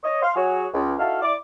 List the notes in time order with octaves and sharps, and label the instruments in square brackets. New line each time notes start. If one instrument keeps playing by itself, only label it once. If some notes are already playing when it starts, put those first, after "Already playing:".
[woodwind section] C#5 D#5
F5 C6
F#3 F#4 G#4 C#5
C#2
D#4 E4 F#4 A4 F5
E4 D5 D6